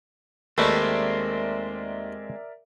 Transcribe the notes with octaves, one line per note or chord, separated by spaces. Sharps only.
D#2 G#3 A3 C4 A#4 B4 D5 E5